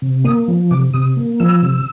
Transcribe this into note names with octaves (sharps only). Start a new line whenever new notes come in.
C3
A#3 D#6
F3
C3 D6
C3 D#6
A#3
F3 E6
C3